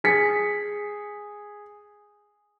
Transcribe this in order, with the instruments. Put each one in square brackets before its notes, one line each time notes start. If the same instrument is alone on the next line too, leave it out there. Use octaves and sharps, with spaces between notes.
[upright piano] G#4 B6 C#7